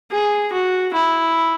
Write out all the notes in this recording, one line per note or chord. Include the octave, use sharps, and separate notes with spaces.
G#4
F#4
E4